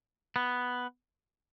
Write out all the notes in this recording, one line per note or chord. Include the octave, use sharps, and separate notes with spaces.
B3